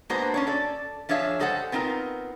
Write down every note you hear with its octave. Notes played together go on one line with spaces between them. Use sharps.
G#3 A#3 B3 D4 F#4 C5
C#4 D4 C#5
A4 D5
F3 D4 G#4 C#5 E5 F5
G3 G#3 A4 C5 F5 F#5
B3 C4 D#4 F4 A#4